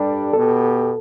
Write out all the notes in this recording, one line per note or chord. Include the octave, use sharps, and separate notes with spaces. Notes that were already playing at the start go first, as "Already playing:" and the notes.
Already playing: G2 G3 D4 A4
B2 B3 G4 A4